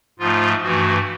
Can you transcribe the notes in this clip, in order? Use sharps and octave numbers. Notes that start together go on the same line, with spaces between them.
G#2 F3 A3 F4
G2 E3 A3 F#4